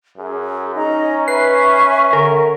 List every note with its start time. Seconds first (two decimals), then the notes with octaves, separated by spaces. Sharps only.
0.18 F#2 G#4
0.75 C#4 D#4 D#5 A#5
1.28 B4 E5 G#5 C#6 C7
2.13 D3 A#4